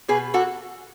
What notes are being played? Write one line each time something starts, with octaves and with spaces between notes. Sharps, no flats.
B2 G#4 B4
F#4 A4